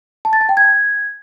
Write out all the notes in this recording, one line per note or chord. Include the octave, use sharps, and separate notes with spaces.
A5
A6
A5
G5
G#6